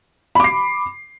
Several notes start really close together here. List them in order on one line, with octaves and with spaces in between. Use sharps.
B5 D6 C7